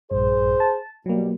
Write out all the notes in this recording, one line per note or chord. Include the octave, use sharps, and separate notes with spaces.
A#1 G2 G#4 C5
A5
B2 F#3 G3 A#3